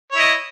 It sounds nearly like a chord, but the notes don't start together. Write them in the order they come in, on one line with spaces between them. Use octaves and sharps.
C#5 E4 D#5